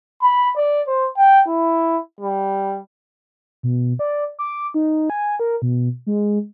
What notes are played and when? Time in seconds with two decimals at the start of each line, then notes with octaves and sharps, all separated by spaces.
0.22 B5
0.56 D5
0.87 C5
1.16 G5
1.48 E4
2.21 G3
3.63 B2
3.99 D5
4.39 D6
4.74 D#4
5.10 G#5
5.40 A#4
5.62 B2
6.07 G#3